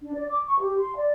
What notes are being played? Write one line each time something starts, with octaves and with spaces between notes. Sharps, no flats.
D4
D5
D6
C#6
G4
C6
D5